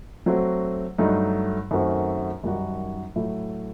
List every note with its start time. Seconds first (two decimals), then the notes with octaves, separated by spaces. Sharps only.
0.26 F#3 A3 C4 F#4
0.98 G2 F#3 A3 D#4
1.71 F#2 D#3 A3 C4 F#4
2.44 F#2 D#3 G3 D#4 F#4
3.16 A2 F#3 A3 E4